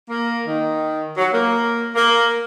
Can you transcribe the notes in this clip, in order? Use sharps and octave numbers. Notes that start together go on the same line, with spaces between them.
A#3
D#3
F#3
A#3
A#3